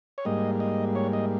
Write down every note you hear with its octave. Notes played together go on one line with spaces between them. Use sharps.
C#5
G#2 G3 A#3 D#5
D#5
C#5
D#5